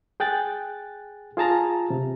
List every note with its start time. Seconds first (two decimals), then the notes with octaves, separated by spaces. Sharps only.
0.20 G#4 G5 F#6 A6
1.37 F4 G#4 A5 A#5
1.90 C3